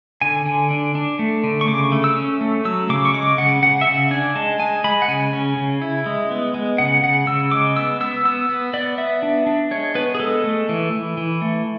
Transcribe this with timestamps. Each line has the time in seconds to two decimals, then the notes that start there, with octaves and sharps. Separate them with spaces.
0.21 D3 G#5
0.46 D3
0.71 D4
0.95 D4
1.19 A3
1.44 D3
1.61 C#6
1.68 C#3 D6
1.92 A3
2.04 E6
2.16 C#4
2.41 A3
2.65 F#3 E6
2.89 C#3 D6
3.05 C#6
3.14 G#3 D6
3.38 C#3 F#5
3.62 C#3 F#5
3.81 E5
3.87 C#3 F#5
4.11 D4 G#5
4.36 G#3 A5
4.60 G#3 G#5
4.84 G#3 B5
5.02 F#5
5.08 C#3 G#5
5.33 C#4
5.57 C#3
5.82 E4
6.06 G#3
6.31 B3
6.54 G#3
6.78 C#3 F#5
7.03 C#3 F#5
7.27 C#3 E6
7.51 G#3 D6
7.77 B3 E6
8.00 B3 E6
8.25 B3 E6
8.49 B3
8.74 B3 D5
8.98 B3 E5
9.23 D4
9.47 D4
9.71 G#3 C#5
9.95 B3 B4
10.15 G#4
10.20 G#3 A4
10.44 A3
10.69 E3
10.92 E3
11.17 E3
11.42 A3